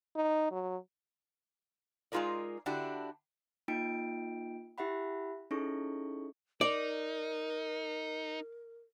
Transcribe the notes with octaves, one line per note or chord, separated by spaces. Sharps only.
D#4
F#3
G#3 D#4 F4 G#4 A#4 D5
D3 D4 E4 F#4 G4
A#3 D#4 F4 G5 D7
E4 G4 E5 F#5 B5
C#4 D#4 E4 G#4 A4 C#6
D#4 A#4 D5